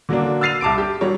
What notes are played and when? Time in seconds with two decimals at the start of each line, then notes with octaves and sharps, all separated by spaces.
0.09 D3 F#3 A#3 D4
0.41 E6 F6 A6 C7 D#7 F7
0.61 C2 A5 D6 D7
0.78 G4
1.01 F#3 G3 C#5